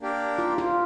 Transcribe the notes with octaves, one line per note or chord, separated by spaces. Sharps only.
A#3 D4 G4 A#4
F4
F4